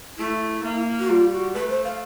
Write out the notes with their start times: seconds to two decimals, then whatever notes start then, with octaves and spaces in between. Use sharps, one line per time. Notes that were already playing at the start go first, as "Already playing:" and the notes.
0.18 A3 E4
0.64 A#3
0.99 F#4
1.09 G3 F4
1.32 F#4
1.54 A3 B4
1.70 C5
1.84 F5